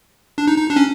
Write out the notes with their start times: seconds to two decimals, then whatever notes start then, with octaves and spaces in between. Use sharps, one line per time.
0.38 D4
0.47 D#4
0.58 D#4
0.70 D4
0.76 C#4